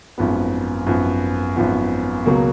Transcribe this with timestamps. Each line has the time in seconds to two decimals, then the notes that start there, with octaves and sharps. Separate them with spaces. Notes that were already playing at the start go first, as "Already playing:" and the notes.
0.18 G#1 F#2 F3 B3
0.86 G#1 F#2 F3 B3
1.56 G#1 F#2 F3 B3
2.26 C#2 B2 F#3 A#3